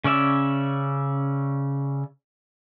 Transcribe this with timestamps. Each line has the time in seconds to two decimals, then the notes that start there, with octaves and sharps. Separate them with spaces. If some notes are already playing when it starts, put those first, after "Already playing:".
0.04 C#3 C#4 D5 E5